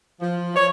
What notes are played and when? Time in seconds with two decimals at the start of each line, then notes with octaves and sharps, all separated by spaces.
0.20 F3
0.56 F3 C#5